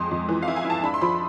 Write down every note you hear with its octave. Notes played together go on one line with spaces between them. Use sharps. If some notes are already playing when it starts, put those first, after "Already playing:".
Already playing: F2 G#3 C6
F2
E3
F5
E4
G#5
E4
A5
D4 B5
C6
F3 B5